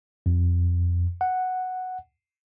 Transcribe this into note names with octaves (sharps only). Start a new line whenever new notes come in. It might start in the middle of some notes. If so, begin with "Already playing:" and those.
F2
F#5